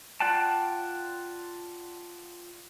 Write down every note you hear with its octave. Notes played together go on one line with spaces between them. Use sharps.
F4 D5 F#5 G5 A5